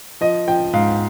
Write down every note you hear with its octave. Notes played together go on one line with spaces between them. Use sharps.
F3 D#5
F3 G5
G#2 F5